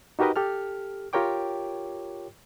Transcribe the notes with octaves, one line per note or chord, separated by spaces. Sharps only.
D#4 F#4 G4 A#4 B4 D#5
G4 A4 F6
F4 G4 A#4 C#5 G5 D6